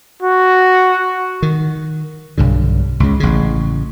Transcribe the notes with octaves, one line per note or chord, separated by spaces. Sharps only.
F#4
D#3
B1 G2 D3
C#2 C#3
A1 C#3